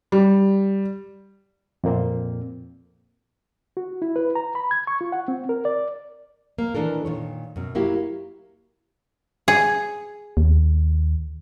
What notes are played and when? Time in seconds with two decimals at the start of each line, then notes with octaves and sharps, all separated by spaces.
0.12 G3
1.84 F2 A#2 A#3 C4
3.77 F#4
4.02 E4
4.16 B4
4.35 A#5
4.55 B5
4.71 G#6
4.87 C#6
5.01 F4
5.12 F#5
5.28 C4
5.49 A#4
5.65 D5
6.58 A#3
6.75 D#3 E3 D4 A4 A#4
7.05 A#2 D#3 C#5
7.56 F#2 B2
7.75 F#3 A#3 E4 G4
9.48 G#4
10.37 D#2